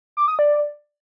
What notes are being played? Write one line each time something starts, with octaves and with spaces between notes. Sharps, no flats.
D6
D#6
D5